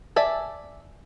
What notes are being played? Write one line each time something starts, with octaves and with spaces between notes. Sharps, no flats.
D5 E5 G#5 A5